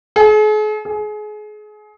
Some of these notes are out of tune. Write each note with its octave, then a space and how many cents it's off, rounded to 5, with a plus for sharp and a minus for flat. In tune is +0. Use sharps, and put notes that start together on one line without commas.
G#4 +45
G#4 +30